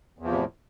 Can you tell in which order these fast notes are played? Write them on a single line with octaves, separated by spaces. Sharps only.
E2 E3 F3 C3 A2